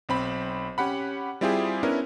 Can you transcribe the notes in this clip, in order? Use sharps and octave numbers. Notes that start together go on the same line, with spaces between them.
B1 C4 B5
C#4 G4 F#5 B5
G3 C4 E4 F4 G4 G#4
B3 C#4 D4 E4 A#4